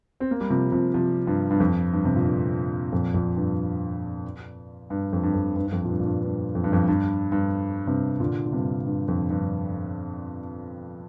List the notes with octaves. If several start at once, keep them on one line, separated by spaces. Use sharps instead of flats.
C4
A#3
G3
C3 F3
C3 F3
C3 F3
G2
G2
F2
G2
C3
A#2
G2
F2 A#2
F2 A#2
G2
G2
F2
G2
F2
G2
G2
F2
A#2
G2
A#2
G2
G2
F2
G2
F2
G2
G2
G2 C3
A#2 D3
D3
G2 C3
G2
F2
G2